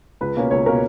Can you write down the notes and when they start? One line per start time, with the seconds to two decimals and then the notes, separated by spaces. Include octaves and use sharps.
0.21 C#2 B4
0.36 B2 A#3 C#4
0.51 C#2 C#5
0.66 B2 A#3 C#4 A#4